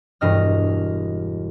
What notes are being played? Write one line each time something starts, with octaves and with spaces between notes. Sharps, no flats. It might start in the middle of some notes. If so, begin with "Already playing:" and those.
E1 G2 D#5 F6